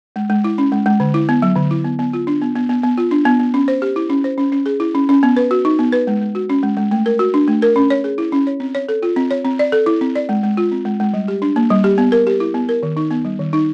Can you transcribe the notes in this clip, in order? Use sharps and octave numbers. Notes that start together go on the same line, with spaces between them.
G#3
G#3
E4
C#4
G#3
G#3
D3
E4
B3
F#3
D3
E4
B3
B3
F4
D4
B3
B3
B3
B3
F4
D4
B3
B3
C#4
C5
G4
E4
C#4
C5
C#4
C#4
G#4
E4
C#4
C#4
B3
B4
F#4
D#4
B3
B4
G#3
G#3
F#4
C#4
G#3
G#3
A3
A#4
F#4
D4
A3
A#4
C#4
C#5
G#4
E4
C#4
C#5
C4
C#5
A4
F4
C4
C#5
C4
D5
A4
E4
C4
D5
G#3
G#3
F4
C4
G#3
G#3
G3
G4
D4
A#3
G3
G4
B3
A#4
G4
E4
B3
A#4
D#3
D#4
B3
G3
D#3
D#4